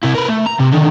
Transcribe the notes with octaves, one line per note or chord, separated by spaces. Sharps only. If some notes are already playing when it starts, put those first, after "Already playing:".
C3 E4
A#4 B4
A3
A#5
C3
D3 D#3